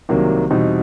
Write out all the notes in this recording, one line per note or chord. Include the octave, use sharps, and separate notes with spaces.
C2 C3 D#3 F#3 A#3
E2 B2 G3 C4 D#4